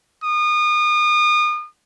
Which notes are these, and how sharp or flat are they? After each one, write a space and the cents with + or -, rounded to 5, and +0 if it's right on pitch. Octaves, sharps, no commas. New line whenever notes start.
D#6 -35